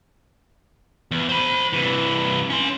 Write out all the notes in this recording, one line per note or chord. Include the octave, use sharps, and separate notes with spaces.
E2
C5 B5
C2 E3
C#4 C6